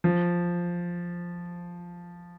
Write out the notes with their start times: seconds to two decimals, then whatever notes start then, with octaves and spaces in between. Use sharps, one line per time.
0.04 F3